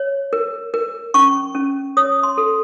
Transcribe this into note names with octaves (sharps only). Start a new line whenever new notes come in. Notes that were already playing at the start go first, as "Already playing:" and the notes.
Already playing: C#5
A#4
A#4
C#4 C#6
C#4
C#5 D#6
C6
A4